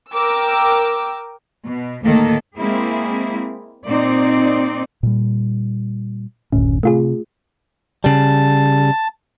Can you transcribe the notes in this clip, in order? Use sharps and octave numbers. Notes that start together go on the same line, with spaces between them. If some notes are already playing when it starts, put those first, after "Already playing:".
A#4 G5 D6 E6
B2
D2 A2 D#3 A#3 A4
G#3 A#3 C4 E4 G#4
A#2 C4 D#4 D5
A#2 G3
F#1 D2 A2 C#4
C3 A3 F4 G#4
C#3 G3 A5